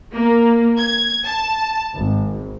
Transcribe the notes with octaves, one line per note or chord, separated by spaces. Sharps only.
A#3
G#6
A5
G#1